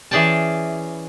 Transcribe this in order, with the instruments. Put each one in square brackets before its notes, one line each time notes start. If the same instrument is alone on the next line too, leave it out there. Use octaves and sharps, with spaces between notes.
[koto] E3 C#4 G#4 D5 G5 A5